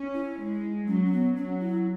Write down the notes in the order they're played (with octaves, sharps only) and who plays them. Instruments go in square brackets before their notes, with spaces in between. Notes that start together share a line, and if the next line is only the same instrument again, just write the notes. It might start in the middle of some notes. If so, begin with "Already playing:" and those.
Already playing: [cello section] C#4
[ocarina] E4
[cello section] G#3
[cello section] F#3 [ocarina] C#4
[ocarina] C#4
B3
[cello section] F#3 [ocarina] C#4
[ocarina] E4